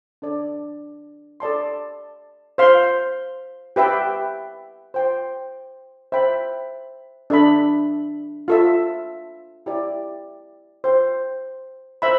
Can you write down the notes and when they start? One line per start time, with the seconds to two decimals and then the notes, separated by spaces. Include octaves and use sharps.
0.22 D4 A4 D5
1.40 A4 D5 A5 C6
2.58 C5 F5 C6
3.76 G4 B4 E5 G5 B5
4.94 C5 G5 C6
6.12 C5 E5 G5 B5
7.30 D4 A4 E5 B5
8.48 F4 A4 E5
9.66 E4 G4 D5 G5
10.84 C5 G5 C6
12.02 C5 E5 B5